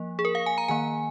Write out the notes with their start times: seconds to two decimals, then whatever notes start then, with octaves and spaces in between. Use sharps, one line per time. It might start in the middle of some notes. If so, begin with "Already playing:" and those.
Already playing: F3 A#3
0.19 G#4
0.25 A#4
0.35 F5
0.46 G#5
0.58 A#5
0.68 D#3 A#3 G#5